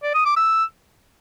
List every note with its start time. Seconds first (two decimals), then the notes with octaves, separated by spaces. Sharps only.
0.04 D5
0.15 D#6
0.26 D6
0.37 E6